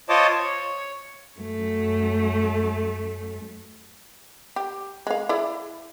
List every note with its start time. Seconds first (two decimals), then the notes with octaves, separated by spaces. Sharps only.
0.09 F4 C5 C#5 D#5 A5 D6
0.39 C#5
1.40 F#2 A3
4.56 G4
5.07 G#3 F5
5.29 E4 G#4 D5